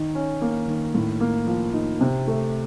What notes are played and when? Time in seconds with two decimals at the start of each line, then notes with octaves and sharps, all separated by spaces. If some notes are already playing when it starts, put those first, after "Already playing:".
Already playing: D#3 D#4
0.15 C#4
0.41 A#3
0.67 D#3
0.94 A2
1.20 A#3
1.47 F3
1.73 D#4
2.01 C3
2.27 A3